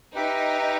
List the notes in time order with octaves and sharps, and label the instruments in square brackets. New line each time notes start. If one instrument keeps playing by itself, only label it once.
[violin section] D#4 [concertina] G4 B4 E5 G5